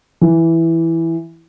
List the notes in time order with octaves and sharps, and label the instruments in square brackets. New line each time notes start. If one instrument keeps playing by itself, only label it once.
[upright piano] E3